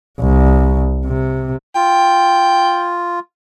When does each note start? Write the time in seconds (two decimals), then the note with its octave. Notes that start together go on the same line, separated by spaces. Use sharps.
0.20 C2
1.06 C3
1.75 F4 G5